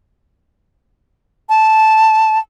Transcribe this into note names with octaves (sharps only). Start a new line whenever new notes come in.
A5